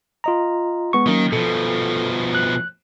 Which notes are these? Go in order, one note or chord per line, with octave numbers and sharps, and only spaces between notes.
F4 D#5 A#5
G#3 B3 C#6
D#3 F#3 A#3 C#4
B2 F3 A4
F#6